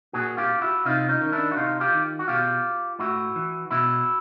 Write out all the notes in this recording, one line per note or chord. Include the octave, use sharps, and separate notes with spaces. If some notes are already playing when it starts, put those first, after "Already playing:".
A#2 F#4 G#4
F4 G4
E4 F#4
C3 D#4 F4
C#4 D#4
D#3
D4 E4
F#4
C3 D#4 F4
F4 G4
D#3
F#4
B2 F4 G4
A2 E4 F#4
E3
B2 E4 F#4